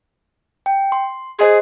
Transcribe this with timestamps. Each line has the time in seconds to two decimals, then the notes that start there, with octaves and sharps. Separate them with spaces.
0.66 G5
0.92 C6
1.39 G#4 C5 D#5 C6